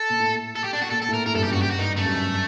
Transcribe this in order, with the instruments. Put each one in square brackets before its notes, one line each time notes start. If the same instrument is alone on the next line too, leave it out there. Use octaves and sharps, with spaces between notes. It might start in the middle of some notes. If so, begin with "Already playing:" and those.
Already playing: [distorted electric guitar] A4
[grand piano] A#2
A2
[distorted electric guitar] A4
G4
D4
F#4
[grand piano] A#2 [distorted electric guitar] A4
[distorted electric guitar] A4
[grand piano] A2
[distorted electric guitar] A#4
[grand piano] A2 [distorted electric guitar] A#4
[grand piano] G2 [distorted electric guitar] A4
[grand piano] F#2 [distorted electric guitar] G4
[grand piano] G2 [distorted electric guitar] F#4
[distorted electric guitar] G4
F#4
[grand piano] G2 [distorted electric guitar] D#4
[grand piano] F#2 [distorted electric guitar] A3
[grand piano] G2
F#2